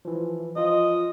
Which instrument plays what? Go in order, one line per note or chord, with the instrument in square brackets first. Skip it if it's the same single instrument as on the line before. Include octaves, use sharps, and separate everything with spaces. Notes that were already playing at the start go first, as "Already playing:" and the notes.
[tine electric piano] E3 F3
[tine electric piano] F3 F4 [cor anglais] D#5